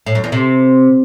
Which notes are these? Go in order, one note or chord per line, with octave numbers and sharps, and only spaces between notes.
A2
F#2
E2
C3